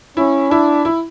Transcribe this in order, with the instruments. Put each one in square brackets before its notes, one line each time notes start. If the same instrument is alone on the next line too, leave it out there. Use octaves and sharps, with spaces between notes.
[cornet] C#4 [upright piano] E4
[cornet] D4 [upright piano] E4
[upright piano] E4